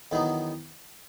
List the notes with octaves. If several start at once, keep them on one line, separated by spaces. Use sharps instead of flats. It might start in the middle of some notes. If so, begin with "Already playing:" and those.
E2 D#3 F#3 B3 D#4